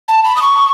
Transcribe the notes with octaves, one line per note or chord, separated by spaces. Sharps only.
A5
B5
D#6
C#6